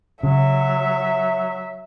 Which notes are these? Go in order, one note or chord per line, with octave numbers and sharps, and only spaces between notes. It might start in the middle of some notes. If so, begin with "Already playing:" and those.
C#3 F#3 E5